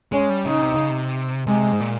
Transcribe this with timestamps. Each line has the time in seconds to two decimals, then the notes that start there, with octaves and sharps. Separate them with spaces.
0.12 G#3 C#4
0.29 G3
0.46 C#3 D#4
0.62 C3
0.76 C#3
0.90 C3
1.47 C3 G#3
1.72 G#2
1.80 A#2